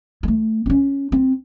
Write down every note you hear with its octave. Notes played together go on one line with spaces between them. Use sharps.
G#3
A3
C4
C#4
C4